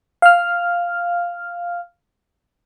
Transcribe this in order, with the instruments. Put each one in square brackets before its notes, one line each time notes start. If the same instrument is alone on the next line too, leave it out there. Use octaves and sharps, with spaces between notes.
[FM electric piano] F5 F6